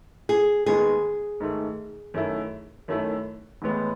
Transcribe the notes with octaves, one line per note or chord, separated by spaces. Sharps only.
G#4
D#2 D#3 G#3 B3 D#4 G#4
G#2 D#3 A3
F#2 D#3 A3 E4
F#2 D#3 A3 E4
A1 A2 G#3 B3